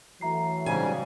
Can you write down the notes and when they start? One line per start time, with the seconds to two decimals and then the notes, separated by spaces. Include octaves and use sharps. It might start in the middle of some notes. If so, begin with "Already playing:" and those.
0.21 E3 F#3 A3 E5 A#5 C7
0.66 G#2 C#3 G3 G#5